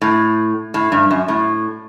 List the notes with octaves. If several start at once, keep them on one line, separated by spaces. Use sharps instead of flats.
A2
A2
G2
F#2
A2